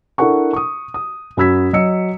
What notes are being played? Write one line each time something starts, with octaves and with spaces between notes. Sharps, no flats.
D4 E4 A4 A#4 F#5 C#6
C#6 D#6
D#6
F#2 F#4 B5 E6 G#6 B6
F#3 D#5 E6 C#7